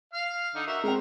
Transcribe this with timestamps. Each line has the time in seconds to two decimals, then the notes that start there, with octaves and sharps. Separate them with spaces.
0.14 F5 F6
0.55 D3 D#4
0.67 F#4 A#4 E5
0.84 G#3 C4 A#4